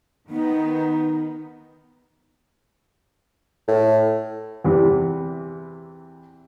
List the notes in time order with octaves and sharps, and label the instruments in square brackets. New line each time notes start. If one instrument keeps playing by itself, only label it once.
[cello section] D#3 B3 [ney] D#4
[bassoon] A2
[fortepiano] E2 C3 E3